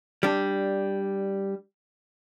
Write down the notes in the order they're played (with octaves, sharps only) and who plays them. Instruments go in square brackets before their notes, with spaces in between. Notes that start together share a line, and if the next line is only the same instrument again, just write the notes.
[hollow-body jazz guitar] G3 D4